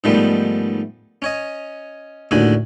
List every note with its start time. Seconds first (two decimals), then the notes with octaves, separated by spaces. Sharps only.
0.04 G#2 D#3 F3 G3 A3 B3
1.22 C#4 C#5 D#5
2.31 D#2 A2 D3 F#4 G#5